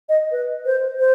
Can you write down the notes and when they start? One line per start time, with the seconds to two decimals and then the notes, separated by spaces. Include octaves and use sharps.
0.09 D#5
0.32 B4
0.66 C5
1.00 C5